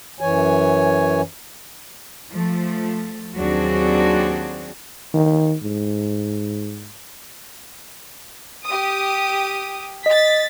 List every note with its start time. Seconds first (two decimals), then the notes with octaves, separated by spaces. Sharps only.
0.20 F#2 E3 C#5 G#5
2.30 F3 A3
3.35 D#2 F#3 C4 D4 F#4 G#4
5.14 D#3
5.63 G#2
8.66 G4 D#6
10.06 D#5 A6 B6